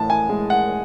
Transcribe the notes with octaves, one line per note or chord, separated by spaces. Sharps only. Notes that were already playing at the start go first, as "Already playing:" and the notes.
Already playing: A2 E3 A5
G#5
G#3
F#5